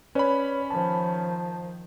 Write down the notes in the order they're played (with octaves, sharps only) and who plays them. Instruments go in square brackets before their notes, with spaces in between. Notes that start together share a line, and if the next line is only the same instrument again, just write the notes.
[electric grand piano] C#4 B5 [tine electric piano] B4 C#5 D5
[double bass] D#3 F3 [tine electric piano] A5